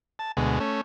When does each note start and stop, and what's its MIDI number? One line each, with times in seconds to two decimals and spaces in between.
0.19 0.32 81
0.37 0.59 38
0.37 0.59 47
0.37 0.59 56
0.60 0.81 57
0.60 0.81 61